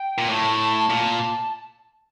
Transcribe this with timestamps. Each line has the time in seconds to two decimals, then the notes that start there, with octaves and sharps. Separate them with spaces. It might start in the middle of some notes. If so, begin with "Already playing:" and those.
Already playing: G5
0.18 A#2
0.29 A2 A5
0.90 A#2